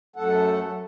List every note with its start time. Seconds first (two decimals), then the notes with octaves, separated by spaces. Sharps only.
0.16 F#2 A3 A4 F#5